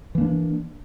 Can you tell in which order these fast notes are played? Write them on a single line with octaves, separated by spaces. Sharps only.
E3 A#3 D4